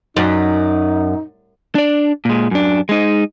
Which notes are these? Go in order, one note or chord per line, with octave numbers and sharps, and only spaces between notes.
F#2 D#4
D4 D5
A#2 G#3
F#2 D4
G#3 D#4